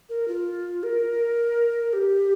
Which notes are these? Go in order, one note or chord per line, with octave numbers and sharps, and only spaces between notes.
A#4
F4
A#4
G4